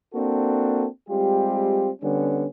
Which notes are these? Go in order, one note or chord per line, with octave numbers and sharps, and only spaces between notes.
A#3 C4 D4 F#4 A4
G3 G#3 C4 F4 G4
D3 G3 B3 C#4